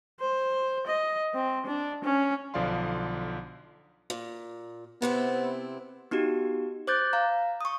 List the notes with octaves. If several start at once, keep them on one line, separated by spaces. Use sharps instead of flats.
C5
D#5
C4
D4
C#4
B1 D3 F3 D5 F5 C6
A#2
C3 B3 C4 E4
B3 D#4 F#4 G4
C5 D6 F#6 G6 A6
F5 A#5
C#6 D#6